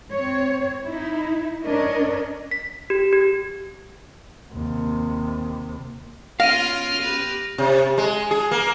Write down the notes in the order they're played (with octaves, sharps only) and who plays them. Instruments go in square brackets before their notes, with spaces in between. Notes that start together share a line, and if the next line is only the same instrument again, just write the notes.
[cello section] C4 C#5
D#4 E4
C#4 D4 A#4 C#5 D#5
[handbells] B6
G4
G4
[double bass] D#2 C3
[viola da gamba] B3 C#4 F4 [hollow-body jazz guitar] F5 [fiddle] F6 [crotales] A#6 D7 D#7
[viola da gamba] G4 B4
[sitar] C3
G#3
G#4
A#3